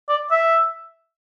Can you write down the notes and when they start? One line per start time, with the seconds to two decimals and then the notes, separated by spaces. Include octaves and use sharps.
0.09 D5
0.31 E5